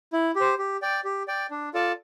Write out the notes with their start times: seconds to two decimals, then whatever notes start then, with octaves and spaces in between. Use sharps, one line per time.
0.13 E4
0.36 G4 C5
0.59 G4
0.82 D5 G5
1.04 G4
1.28 D5 G5
1.51 D4
1.74 F4 A4 D5 A5